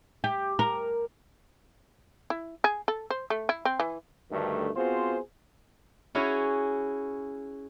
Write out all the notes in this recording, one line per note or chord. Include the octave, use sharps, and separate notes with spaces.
G4
A#4
E4
G#4
A4
C5
A3
E4
C4
E3
D2 G2 D#3 A3
B3 C4 F4 F#4 G#4 C5
C#4 E4 F#4 G#4 C#5